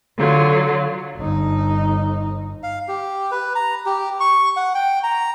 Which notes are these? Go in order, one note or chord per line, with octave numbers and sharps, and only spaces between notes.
D3 F#3 F4
G1 D#4
F5
G4
B4
A#5
G4
C#6
F#5
G5
A#5